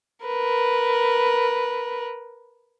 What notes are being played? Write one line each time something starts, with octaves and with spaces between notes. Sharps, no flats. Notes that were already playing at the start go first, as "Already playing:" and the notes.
A#4 B4